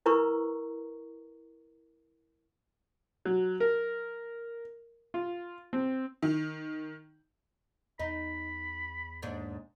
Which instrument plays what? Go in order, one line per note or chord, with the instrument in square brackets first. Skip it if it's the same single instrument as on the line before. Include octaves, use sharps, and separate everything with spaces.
[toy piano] E4 A#4 B4 A#5 C#6
[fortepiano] F#3
A#4
F4
C4
[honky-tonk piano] D#3
[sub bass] E2 [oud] D#4 [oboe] B5
[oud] D#2 G#2 D4